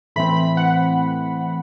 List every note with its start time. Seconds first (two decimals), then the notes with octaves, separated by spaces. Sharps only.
0.16 A2 E3 A3 C4 B5
0.37 B5
0.57 F#5